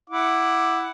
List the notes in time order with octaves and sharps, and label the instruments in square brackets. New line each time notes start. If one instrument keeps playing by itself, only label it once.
[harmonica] E4 F#5 D6